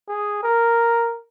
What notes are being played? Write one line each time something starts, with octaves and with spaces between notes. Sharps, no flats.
G#4
A#4